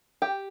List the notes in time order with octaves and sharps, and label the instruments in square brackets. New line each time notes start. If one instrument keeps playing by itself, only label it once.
[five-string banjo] G4